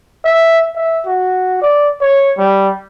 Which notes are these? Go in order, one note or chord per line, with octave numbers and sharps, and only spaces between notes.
E5
E5
F#4
D5
C#5
G3